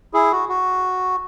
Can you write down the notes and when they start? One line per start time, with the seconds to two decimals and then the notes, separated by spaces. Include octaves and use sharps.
0.14 E4 G#4
0.32 F#4
0.49 F#4